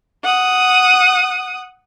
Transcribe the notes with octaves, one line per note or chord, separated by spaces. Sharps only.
F#5 D#6